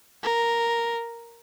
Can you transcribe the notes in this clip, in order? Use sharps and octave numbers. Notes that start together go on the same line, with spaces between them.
A#4